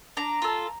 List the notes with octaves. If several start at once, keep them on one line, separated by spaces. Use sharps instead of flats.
D4 A#5
F4 A4